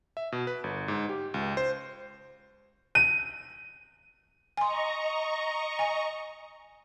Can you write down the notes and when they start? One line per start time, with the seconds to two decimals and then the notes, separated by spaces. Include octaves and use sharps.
0.17 E5
0.32 B2
0.47 B4
0.64 G1
0.88 G#2
1.09 G4
1.34 C#2
1.57 C5
2.95 D#7
4.57 D#5 G#5 A#5 C6 C#6
5.79 G#5